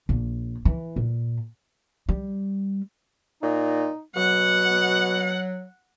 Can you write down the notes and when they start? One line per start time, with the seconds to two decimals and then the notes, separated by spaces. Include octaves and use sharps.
0.09 A#1
0.65 E3
0.96 A#2
2.09 G3
3.43 A#2 D#4
4.16 B2 F#3 F#5